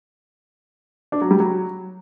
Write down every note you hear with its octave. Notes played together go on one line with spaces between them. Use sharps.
D4
F#3
G3
F#3